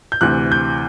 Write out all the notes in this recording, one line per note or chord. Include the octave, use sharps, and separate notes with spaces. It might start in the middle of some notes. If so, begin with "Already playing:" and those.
G6
D2 C3 E3 F#6
G6